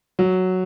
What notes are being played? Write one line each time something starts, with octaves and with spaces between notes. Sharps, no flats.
F#3